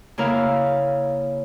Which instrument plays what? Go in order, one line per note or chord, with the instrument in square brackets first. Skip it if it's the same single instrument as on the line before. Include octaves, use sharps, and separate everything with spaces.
[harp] C#3 A#3 E4 A#4 F5